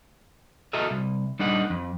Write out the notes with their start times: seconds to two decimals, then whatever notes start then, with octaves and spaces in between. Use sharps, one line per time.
0.73 F#4 A4 A#4 D#5 E5
0.91 C2
1.39 G3 D4 D#4 A#4 D#5 F#5
1.70 F2